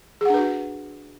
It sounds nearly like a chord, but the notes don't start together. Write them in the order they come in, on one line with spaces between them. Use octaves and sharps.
G#4 F#5 D4 B4 F#4